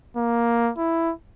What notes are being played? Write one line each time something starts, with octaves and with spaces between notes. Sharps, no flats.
A#3
E4